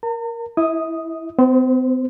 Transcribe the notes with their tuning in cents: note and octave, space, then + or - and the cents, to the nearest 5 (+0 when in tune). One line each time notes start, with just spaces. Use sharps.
A#4 +5 A#5 -45
E4 +0 E5 -45 D#6 +0
C4 -45 C5 +0